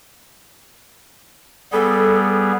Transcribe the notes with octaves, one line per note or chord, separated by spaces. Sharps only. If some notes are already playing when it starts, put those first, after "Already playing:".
G3 B3 G#4 A4